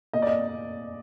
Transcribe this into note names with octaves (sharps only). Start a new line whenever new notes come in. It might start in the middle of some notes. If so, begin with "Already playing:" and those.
A#2 D#5
D5
D#5